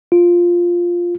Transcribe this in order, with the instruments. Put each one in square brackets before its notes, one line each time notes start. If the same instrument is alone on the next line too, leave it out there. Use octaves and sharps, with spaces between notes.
[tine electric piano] F4